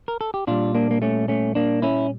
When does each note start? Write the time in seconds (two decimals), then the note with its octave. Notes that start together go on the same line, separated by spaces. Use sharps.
0.08 A#4
0.21 A4
0.34 G4
0.47 A#2 G3 D4 F4
0.75 A#3 D4
0.91 A#3
1.02 A3 C#4
1.28 A3 C#4
1.55 A#3 D4
1.82 C#4 E4